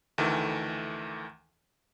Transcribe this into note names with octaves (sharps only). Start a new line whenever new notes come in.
D2 D#3 E3 A3